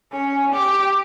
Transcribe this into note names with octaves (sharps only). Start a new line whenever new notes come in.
C#4
G4